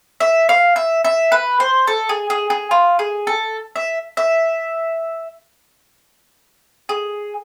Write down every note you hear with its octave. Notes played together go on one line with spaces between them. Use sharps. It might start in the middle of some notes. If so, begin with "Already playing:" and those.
E5
F5
E5
E5
B4
C5
A4
G#4
G#4
G#4
F4
G#4
A4
E5
E5
G#4